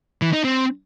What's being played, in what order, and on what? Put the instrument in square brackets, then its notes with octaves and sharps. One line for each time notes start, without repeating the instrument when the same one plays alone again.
[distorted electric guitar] E3
D#4
C4